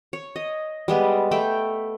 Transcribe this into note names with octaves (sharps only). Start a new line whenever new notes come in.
C#5
D#5
G3 G#3 B3
A3 G5 B5